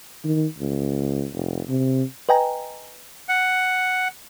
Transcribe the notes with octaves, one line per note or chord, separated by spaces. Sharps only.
D#3
C#2
F1
C3
B4 D#5 G5 G#5 A#5
F#5